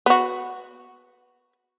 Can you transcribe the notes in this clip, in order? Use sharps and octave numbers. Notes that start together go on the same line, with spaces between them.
B3 F#4